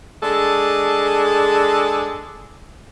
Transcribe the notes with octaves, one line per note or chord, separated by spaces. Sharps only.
G#3 D4 G#4 A4